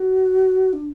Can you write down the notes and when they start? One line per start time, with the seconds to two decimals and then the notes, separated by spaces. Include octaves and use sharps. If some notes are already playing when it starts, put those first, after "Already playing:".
Already playing: F#4
0.73 D4